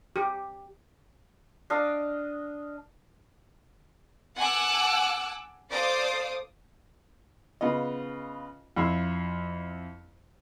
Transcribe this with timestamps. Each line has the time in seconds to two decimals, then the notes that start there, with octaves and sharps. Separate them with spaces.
0.16 G4
1.70 D4 D#5 F5
4.37 F#5 G#5 A5 D6 E6 F#6
5.71 A4 C5 D5 F5 D6 D#6
7.61 C#3 B3 F4 D#5
8.77 F2 E4 F5 C6 E6